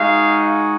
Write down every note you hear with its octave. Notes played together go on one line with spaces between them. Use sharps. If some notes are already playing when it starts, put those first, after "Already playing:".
Already playing: G#3 D#4 F#4 F5